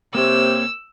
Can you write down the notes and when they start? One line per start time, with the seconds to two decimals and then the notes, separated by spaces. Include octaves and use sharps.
0.15 C3 A#3 C4 C#5 E6